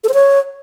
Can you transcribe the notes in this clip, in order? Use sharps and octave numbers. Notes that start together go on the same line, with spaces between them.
A4
C5
C#5